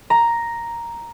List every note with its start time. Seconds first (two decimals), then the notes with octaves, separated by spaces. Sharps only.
0.10 A#5